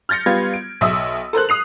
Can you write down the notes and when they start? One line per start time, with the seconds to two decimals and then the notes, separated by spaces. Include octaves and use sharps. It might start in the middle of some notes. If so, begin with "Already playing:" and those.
0.09 F6 G6 A6 A#6 C#7
0.26 G3 B3 F4 G#6
0.54 D7
0.81 B1 E5 D#6 E6
1.33 A4 A#4 C5 F#6
1.49 D#6 C7 F7